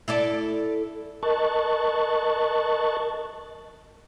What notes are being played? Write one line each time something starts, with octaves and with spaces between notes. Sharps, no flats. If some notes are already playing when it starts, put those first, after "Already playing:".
E4 A4 D5
A#4 D#5 A5 C#6 F#6 A6